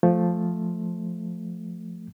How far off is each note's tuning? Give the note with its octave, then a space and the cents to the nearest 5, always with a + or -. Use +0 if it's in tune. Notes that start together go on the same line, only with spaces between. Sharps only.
F3 +0 A3 -5